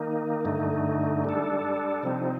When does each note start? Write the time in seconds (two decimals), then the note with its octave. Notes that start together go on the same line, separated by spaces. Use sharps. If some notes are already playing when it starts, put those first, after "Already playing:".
Already playing: D#3 A#3 D#4
0.45 G2 D3 A3 D#4
1.25 G3 D4 A4
2.03 C3 F3 C4 D#4